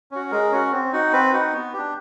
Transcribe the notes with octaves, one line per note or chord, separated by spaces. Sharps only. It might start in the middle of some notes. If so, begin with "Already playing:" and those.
C#4 F#4
G#3 A#4
C#4 F#4
C4
D#4 F#4
C4 B4
D#4 F#4
B3
D4 G4